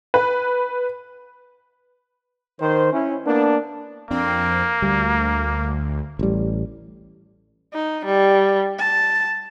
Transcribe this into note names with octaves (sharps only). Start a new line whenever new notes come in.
B4
D#3 C5
C#4 E4
A#3 B3 D4
F2 A#3 C4 D4
D2 G3
A1 G3
D#4
G3
A5